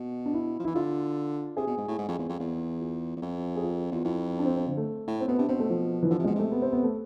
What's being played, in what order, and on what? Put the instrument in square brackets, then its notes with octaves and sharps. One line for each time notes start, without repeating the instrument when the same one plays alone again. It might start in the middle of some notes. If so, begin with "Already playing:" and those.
Already playing: [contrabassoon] B2
[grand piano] D4
E4
[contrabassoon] F3
[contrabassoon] E3 [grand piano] E4
[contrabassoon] D3 [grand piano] F4
[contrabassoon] C3 [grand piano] G#4
[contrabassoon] B2
G#2
A2
G#2
F2
E2
F2
E2
[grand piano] F4
[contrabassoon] E2
F2
[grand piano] G#4
F4
[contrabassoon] E2 [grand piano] F4
[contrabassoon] F2 [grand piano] E4
[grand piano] D4
C4
C4
D3
A3
[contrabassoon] A2
[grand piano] C4
[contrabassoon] B2 [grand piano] B3
[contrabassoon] C3 [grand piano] D4
[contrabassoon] B2 [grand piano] C4
[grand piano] A3
F3
E3
[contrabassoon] D3 [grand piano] F3
[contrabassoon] C3
[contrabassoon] B2 [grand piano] G#3
[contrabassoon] C3 [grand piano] A3
[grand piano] B3
C4
B3
A3